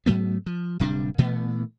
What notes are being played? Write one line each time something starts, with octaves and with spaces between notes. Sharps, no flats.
G#2 F#3 A3 B3
F3
D1 C3 G3 D4
A#2 E3 A3 B3